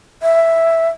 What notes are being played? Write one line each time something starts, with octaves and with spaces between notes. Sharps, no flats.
E5